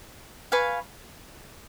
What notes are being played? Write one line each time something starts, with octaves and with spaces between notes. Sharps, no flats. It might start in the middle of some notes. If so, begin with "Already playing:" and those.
B4 F5 G#5 C#6